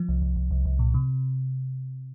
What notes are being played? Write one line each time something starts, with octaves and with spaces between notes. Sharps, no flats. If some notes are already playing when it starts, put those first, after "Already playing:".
Already playing: F3
C2
C2
C2
C2
C2
A#2
C3